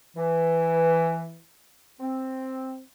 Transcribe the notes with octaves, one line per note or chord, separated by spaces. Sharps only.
E3
C4